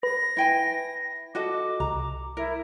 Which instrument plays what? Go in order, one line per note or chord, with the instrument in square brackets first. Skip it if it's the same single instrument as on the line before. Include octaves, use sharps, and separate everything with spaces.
[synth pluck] B4 [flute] A#6
[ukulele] E4 G5 G#5
[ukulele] F#4 A4 D#5 [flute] D6
[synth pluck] C2 [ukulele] A#5
[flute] E4 [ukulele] A#4